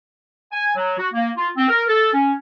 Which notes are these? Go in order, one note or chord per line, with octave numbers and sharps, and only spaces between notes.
G#5
F#3
F#4
A#3
F4
C4
A#4
A4
C#4